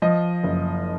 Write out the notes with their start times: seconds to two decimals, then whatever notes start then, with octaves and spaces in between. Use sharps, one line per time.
0.02 F3 D#5
0.43 F#1